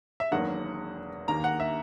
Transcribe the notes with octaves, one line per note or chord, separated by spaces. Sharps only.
E5
E1 E2 D#3 F#3 A#3 F#5
D#2 D#3 A#3 A#5
F#5
E5